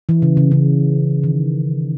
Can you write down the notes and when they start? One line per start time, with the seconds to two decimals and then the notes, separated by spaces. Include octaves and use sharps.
0.09 E3
0.22 C#3
0.37 C#3
0.52 C#3
1.24 D#3